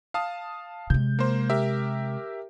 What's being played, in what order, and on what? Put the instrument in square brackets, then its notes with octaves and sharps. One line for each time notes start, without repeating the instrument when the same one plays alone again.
[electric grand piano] F5 A5 D#6
[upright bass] C3 G#3 [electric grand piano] G6
[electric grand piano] A#3 C5
G4 A#4 E5